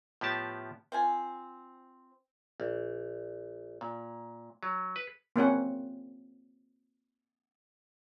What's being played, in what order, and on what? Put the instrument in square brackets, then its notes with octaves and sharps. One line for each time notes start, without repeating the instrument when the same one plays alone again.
[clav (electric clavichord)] A2 F3 B3 G4 A5
[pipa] C4 F4 G#5
[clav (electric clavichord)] A#1
A#2
F#3
B4
[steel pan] A#3 C4 C#4 F#5